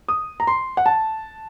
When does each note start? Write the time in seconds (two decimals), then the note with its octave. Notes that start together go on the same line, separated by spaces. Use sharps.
0.08 D#6
0.40 A#5
0.47 C6
0.77 F#5
0.86 A5